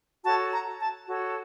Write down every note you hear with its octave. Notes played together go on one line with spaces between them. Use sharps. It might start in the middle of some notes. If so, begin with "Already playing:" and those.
F#4 A4 C#5 A5
A#5
A5
F#4 A4 C#5